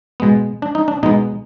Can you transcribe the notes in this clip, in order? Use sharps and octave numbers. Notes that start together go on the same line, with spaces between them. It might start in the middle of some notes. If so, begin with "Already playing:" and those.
B2 G#3 B3
D4
D#4
D4
B2 G#3 B3 D#4